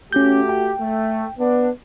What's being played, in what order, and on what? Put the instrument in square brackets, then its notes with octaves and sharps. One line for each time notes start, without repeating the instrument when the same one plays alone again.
[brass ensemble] A3 F#4 G4 [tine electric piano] C#4 G6
[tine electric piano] G5
[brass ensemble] A3
B3 D4